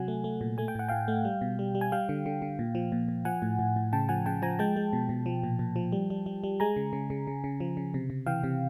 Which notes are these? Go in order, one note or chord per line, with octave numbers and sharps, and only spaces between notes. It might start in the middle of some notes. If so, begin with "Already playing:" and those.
Already playing: C3 F#3 F#5 G#5
A3
A3
A#2
A3 G#5
G5
A2 F#5
A2 F5 G5
A3
G3
B2
G3
G3
G#5
G3 F5 G5
D3
D3
D3
A#2
F3
A#2
A#2
F3 F#5 G#5
A2
A2
A2
C#3 G5 A5
F3 F#5 G#5
C#3 G5 A5
F3 G#5 A#5
G#3 G5 A5
G#3
B2
B2
F3
A#2
A#2
F3
G3
G3
G3
G3
G#3 G#5 A#5
C#3
C#3
C#3
C#3
C#3
F3
C#3
C3
C3
E3 F5 G5
C3